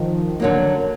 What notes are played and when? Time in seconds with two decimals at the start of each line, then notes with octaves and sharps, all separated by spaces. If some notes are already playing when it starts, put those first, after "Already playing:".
Already playing: D#3 F3
0.40 D3 F#3 A#3